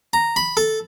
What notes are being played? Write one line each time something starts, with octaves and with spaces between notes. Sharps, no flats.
A#5
B5
A4